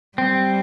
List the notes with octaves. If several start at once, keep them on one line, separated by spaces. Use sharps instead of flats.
G3 C4